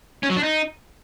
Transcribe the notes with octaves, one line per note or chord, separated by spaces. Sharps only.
C#4
F#3
D4
D#4